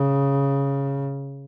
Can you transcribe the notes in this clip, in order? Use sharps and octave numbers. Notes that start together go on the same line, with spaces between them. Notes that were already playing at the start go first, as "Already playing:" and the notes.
Already playing: C#3